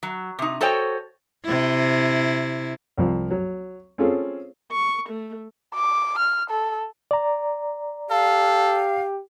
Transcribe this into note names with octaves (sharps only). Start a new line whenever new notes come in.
F#3
C3 D#4
F#4 A4 C5 C#5 D#5 G5
C3 E4
C2 F3
F#3
C4 C#4 F4 G#4 A4
C#6
A3
D6
F6
A4
D5 A#5
G4 A4 F5